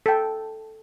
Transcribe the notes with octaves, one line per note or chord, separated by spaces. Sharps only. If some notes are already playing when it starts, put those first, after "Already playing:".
A4 G5